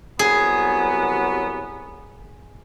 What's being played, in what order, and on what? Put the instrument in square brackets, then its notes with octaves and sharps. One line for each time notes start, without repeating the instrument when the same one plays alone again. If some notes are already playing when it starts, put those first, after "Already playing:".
[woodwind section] C2 F#3 B3 [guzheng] G#4